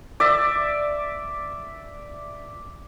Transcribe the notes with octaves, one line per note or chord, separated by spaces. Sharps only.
D5 E5